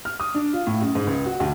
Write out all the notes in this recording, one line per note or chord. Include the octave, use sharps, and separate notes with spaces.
F6
D#6
D4
F4
A2
F#2
G#2
C#2
F#4
D2